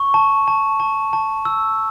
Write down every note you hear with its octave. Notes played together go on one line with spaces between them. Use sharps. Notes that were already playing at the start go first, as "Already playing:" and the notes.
Already playing: C#6
A5
A5
A5
A5
E6